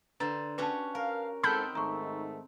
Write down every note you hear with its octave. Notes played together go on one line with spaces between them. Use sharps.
D3 B4 C5 A#5 A6
C#4 F#4 G4 B4 A5
A#4 F5
G#2 C4 D#4 A4 F#5 B5 F6 G6
G#2 D#3 A3 A#5 C#6